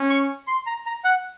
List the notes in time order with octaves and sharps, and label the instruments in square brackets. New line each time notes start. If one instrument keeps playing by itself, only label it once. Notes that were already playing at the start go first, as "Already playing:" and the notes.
Already playing: [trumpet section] C#4
[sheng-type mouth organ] C#6
C6
A#5
A#5
F#5